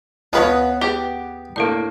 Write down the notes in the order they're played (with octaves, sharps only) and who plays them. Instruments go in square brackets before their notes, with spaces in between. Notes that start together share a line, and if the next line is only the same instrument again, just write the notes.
[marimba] D2 [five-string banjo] F3 B4 C#5 [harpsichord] B3 [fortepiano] D#5 D#6
[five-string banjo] G4 [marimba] G#4 B4
[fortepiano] A2 A#3 [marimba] D4 A4 D5